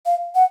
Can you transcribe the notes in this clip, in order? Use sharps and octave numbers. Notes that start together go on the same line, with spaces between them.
F5
F#5